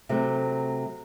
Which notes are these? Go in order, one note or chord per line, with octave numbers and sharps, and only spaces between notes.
C3 F#3 A3